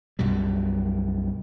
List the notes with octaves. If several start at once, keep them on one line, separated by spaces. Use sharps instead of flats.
B1 F#2 B2 G3